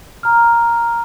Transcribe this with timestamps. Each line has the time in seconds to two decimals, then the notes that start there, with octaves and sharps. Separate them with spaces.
0.23 A#5 F6